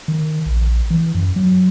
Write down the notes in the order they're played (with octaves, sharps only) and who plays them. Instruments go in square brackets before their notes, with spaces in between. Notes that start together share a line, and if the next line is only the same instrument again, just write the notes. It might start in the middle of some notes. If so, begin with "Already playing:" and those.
[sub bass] D#3
A#1
E3
F#2
F#3